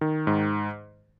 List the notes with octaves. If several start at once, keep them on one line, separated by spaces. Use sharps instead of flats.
D#3
G#2